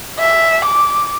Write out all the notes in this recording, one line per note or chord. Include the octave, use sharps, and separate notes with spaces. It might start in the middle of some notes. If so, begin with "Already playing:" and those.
E5
D6